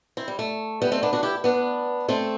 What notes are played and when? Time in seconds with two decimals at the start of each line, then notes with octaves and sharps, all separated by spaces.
0.17 C4 E4
0.28 G3
0.39 A3
0.82 G3 B3
0.92 A3 C4
1.03 B3 D4
1.13 D4 F#4
1.23 E4 G4
1.44 B3 D4
2.08 A3 C4